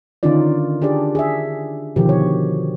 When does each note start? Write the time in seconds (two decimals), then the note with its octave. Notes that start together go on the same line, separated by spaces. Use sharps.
0.23 D3 D#3 C#4 D#4 F4 D5
0.82 D4 G4 G#4 D5
1.15 G#4 E5
1.96 B2 D3 D#3 F3 G4
2.09 C#5